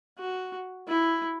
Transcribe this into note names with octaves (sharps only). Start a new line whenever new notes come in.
F#4
E4